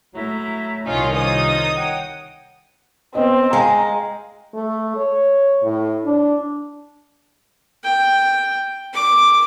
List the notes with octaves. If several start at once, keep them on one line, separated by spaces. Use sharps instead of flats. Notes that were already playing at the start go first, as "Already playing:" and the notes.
F#3 A3 E4 A#5
C2 D#3 C#4 D#4 F4
F4 C5 C#5 D#6
C#5 F#5 G5
B3 C4 D#5
G#3 F5 G5 G#5 A#5
A3
C#5
A2
D4
G5
D6